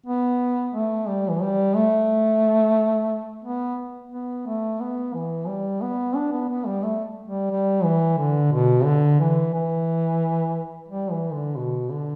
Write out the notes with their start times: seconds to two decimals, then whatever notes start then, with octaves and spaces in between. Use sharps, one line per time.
0.06 B3
0.75 A3
1.08 G3
1.30 E3
1.42 G3
1.75 A3
3.45 B3
4.12 B3
4.47 A3
4.81 B3
5.14 E3
5.48 G3
5.82 B3
6.15 D4
6.32 B3
6.49 B3
6.66 G3
6.83 A3
7.28 G3
7.51 G3
7.84 E3
8.18 D3
8.53 B2
8.85 D3
9.20 E3
9.54 E3
10.89 G3
11.11 E3
11.34 D3
11.57 B2
11.91 D3